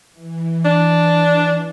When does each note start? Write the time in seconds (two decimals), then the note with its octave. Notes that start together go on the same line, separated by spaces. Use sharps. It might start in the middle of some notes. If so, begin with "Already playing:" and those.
0.13 E3
0.65 D4